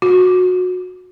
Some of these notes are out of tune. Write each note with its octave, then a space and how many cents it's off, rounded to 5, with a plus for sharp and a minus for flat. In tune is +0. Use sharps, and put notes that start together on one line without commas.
F#4 -20